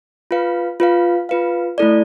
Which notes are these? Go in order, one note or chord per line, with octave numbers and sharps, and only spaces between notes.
F4 B4 F5
F4 B4 F5
F4 B4 F5
A3 E4 A4 D5